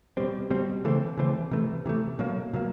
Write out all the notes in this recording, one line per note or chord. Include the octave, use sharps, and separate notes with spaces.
B2 G3 C4
B2 G3 C4
C#3 E3 A3 C4
C#3 E3 A3 C4
C3 E3 A3
C3 E3 A3
B2 F#3 A#3
B2 F#3 A#3